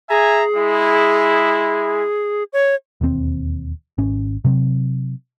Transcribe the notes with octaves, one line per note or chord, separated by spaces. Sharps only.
G#4 E5 G#5 A#5
G#3 E4
C#5
E1 D#2 D#3 C4
G#1 C#4
C3 F#3 C4